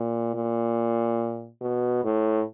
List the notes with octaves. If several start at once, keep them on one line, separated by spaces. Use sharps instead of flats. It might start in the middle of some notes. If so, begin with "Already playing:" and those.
Already playing: A#2
A#2
B2
A2